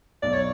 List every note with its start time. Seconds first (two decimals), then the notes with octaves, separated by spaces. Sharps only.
0.22 B1 D5
0.33 C#5